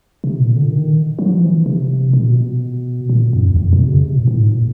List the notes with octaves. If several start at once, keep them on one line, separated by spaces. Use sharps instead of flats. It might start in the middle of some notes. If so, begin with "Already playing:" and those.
C3
A#2
D3
D#3
F#3
F3
E3
C3
B2
A#2
B2
A#2
F#2
E2
F2
B2
C#3
C3
A#2
A2
G#2
A#2